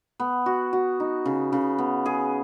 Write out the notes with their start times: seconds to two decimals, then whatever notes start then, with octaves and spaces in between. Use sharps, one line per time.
0.20 B3
0.46 F#4
0.73 F#4
1.00 D#4
1.25 C#3
1.52 C#3
1.78 B3
2.06 G#4